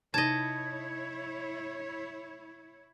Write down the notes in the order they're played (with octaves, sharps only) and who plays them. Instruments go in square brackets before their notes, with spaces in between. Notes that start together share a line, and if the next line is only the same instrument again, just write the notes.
[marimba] C3 D#4 [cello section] E4 C#5 [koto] D#5 A5 [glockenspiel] G#6